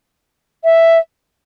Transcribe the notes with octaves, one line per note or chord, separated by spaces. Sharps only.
E5